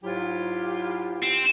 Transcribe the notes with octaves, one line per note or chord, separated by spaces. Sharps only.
G#2 F#3 E4 F4 G4
C4